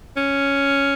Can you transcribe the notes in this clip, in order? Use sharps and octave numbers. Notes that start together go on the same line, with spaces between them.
C#4